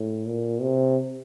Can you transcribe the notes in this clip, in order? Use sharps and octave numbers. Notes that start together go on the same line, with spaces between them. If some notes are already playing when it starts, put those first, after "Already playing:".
Already playing: A2
A#2
C3